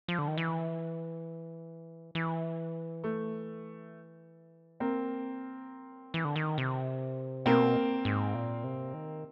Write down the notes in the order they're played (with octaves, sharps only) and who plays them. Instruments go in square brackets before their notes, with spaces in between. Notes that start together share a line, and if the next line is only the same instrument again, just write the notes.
[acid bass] F3
D3
D#3
E3
E3
[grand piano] A3
A#3 C4
[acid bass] F3
F#3
E3
D3
D#3
C3
[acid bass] B2 [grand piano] A#3 C4
[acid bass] G#2
A#2
C3
D#3